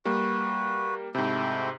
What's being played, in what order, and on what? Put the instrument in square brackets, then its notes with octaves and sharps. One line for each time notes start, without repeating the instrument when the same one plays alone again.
[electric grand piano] G3 A#3 [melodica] F#4 B4
[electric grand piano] G#2 C3 [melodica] A3 E4 G5